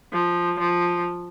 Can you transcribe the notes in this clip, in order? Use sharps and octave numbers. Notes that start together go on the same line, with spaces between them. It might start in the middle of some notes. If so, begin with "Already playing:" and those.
F3
F3